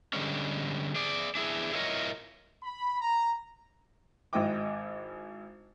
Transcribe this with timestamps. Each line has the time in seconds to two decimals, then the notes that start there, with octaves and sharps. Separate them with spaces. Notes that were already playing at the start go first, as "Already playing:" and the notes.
0.13 D3 G3 G#3 C#4
0.95 G#4 D5
1.35 D4 E4 G#4
1.73 E4 F4 A#4 C#5 D#5
2.63 B5
3.01 A#5
4.33 G#1 G#2 E4 D#5 G5 D6